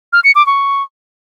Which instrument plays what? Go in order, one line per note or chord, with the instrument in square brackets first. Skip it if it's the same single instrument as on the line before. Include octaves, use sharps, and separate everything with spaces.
[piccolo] F6
C#7
D6
C#6